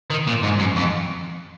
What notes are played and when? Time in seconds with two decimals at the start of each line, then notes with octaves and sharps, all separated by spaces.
0.10 D#3
0.27 A#2
0.43 G#2
0.59 F#2
0.76 F2